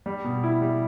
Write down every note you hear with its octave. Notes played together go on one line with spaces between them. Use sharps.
G3
B2
E4
G3